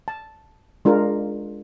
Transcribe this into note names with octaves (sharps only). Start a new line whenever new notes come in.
A5
G#3 D4 F4 A#4